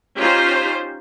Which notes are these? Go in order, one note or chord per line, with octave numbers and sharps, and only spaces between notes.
C#4 D#4 F4 G4 C5